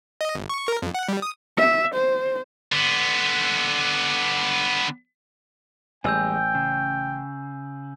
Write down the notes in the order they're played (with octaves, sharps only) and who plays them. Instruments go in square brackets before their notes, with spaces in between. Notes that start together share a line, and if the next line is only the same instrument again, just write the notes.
[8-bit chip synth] D#5
G1
C#6
A#4
F2
F#5
G3
D#6
[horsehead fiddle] E5
C5
[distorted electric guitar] D3 B3
[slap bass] A1 [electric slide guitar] E2 G3 G#3 [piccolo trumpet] G5 [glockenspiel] G#5 E6 G6
[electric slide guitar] C#3